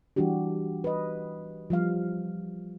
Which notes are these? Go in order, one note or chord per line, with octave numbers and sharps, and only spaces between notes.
E3 G3 D4 F#4 G4
B4 D#5
F3 G3 F5